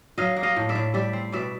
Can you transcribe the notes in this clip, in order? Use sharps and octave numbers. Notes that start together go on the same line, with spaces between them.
F#3 D#5 F5
A#3
D#5 F5
A2
D5 E5
A2
G3 D5 E5
C4
B2 D5 E5